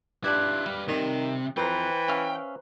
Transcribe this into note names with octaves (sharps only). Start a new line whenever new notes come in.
G2 G3 D4 E4 F4 D6 F#6 G#6
G3 B4 F5
D#2 C3 D#3
F2 E3 B4 C5 G5 A#5
C#4 E5 F5